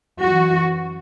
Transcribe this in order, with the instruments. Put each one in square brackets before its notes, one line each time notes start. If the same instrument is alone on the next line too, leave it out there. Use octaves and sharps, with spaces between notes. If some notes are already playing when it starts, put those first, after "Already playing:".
[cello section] F#2 E3 F#4